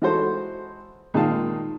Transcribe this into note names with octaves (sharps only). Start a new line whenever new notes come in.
E3 G#3 F#4 A4 C5
A#2 D#3 G#3 A#3 F5 A5